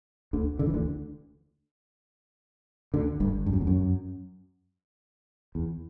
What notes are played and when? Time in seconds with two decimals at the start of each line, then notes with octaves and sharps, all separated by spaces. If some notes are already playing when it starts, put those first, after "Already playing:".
0.33 D2 D3
0.59 D3
0.67 E3
0.74 D2 D3
2.94 D2 D3
3.20 G1 G2
3.46 G2
3.53 F#2
3.61 E2
3.67 F#2
5.55 E2